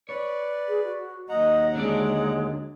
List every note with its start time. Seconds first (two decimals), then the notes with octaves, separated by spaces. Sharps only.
0.09 B4 C#5 D5
0.68 G#4
0.84 F#4
1.29 D#2 F#3 D#5 F#5 A#5
1.75 D3 G#3 D4 D5